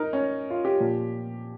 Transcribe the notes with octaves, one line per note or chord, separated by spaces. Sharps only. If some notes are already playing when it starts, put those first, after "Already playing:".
Already playing: D#4 A#4
C#4
F4
G4
A#2 F3